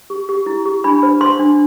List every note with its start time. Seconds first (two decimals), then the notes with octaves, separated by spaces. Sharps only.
0.10 G4
0.29 G4
0.46 E4
0.66 G4
0.84 D4 B5
1.03 C5
1.21 C5 C6
1.39 D4